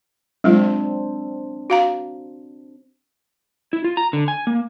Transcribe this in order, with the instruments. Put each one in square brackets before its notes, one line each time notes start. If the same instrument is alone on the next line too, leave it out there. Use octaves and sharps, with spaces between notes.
[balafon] F#3 G#3 F4 [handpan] C4 D4
[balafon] F#4 F5 A#5
[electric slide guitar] E4
F4
A#5
D3
G#5
A#3